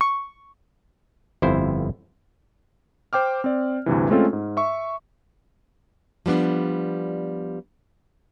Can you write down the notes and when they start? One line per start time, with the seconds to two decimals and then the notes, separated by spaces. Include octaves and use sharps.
0.01 C#6
1.42 G1 F2 E4 C5
3.13 C5 G5 D6 F6
3.44 C4 D5
3.86 D2 G2 C3 E3
4.10 G#3 A3 C4 C#4 F4 A4
4.33 G#2
4.57 E5 C#6
6.26 F3 G3 B3 D4